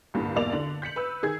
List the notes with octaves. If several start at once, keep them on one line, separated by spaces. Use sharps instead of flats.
C2 G2 A#2 D3
B1 E2 A#3 D5 D6 F7
D3 F#7
G6 B6 C#7 F#7
B4 E6
D#3 G#4 G#6